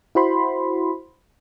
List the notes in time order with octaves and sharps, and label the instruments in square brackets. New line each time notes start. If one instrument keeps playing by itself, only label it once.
[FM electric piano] E4 F#4 C5 B5 C6